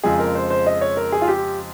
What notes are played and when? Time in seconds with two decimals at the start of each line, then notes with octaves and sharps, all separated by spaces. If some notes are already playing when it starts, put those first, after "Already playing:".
0.04 F2 C#3 F3 G#3 G#4
0.20 A#4
0.35 C5
0.50 C5
0.67 D#5
0.81 C#5
0.97 A#4
1.12 G#4
1.22 F4
1.28 G4